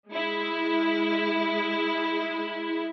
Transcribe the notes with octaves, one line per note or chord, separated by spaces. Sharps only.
G#3 E4